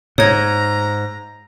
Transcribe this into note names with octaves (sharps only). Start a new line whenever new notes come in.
G#2 C#5 A#5 G#6